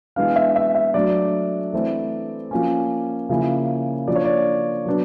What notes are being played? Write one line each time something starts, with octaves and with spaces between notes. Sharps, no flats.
E3 G#3 B3 D4 F5
E5
E5
E5
F#3 A3 D4 D5
E3 A3 C4 E4
F3 A#3 C#4
C#3 F3 A#3 C#4 E4
F3 A#3 D4 D5
C#5
D5
F#3 B3 D4